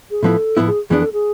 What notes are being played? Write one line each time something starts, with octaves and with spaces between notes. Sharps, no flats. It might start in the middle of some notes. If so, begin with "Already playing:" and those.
G#4
A2 F3 B3 E4 A4
A2 F3 B3 E4
G#4
F2 E3 B3 D4 G#4
A4
G#4